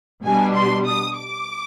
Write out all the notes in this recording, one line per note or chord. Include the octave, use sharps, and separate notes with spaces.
B2 G3 D4 G#5
C6
D#6
D6